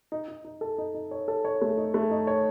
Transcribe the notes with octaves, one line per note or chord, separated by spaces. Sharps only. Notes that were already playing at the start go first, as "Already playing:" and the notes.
D#4
D#4
D#4
A4
D#4
D#4
C#5
A4
C#5
A3
D#4
A3
D#4
C#5